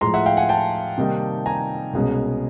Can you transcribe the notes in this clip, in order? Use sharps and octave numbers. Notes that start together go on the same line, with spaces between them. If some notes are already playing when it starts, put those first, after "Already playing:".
A2 F3 G#3 A#5 C6
E5 F#5
F5 G5
F#5 G#5
G5 A5
C3 D#3 G3 A#3 D#4
G#5 A#5
C2 B2 G#3 C#4